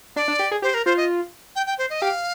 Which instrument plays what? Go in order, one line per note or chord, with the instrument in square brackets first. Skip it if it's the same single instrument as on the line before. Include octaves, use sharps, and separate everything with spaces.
[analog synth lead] D4 [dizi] D5
[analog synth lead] D4
G4
G#4
[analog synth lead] G4 [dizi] C5
[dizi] A#4
[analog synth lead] F4 [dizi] C5
[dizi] D#5
G5
G5
C5
D#5
[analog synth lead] G4 [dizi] F5